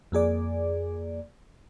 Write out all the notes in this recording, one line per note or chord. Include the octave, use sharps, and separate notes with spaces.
F2 A#3 G#4 D5